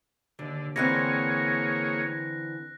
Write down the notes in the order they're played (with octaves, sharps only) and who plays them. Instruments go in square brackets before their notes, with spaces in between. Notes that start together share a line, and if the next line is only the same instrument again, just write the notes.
[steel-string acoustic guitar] D#2 [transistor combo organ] D3
[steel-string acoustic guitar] D3 E3 C4 [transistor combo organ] A#3 G#4 C#5 [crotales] F#6 A#6